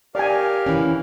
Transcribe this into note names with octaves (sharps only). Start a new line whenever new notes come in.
G4 A#4 D5 F5 G#5
E3 C#4